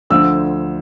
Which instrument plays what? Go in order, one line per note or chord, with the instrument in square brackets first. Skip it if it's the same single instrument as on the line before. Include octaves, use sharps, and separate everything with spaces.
[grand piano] D2 D3 F3 E6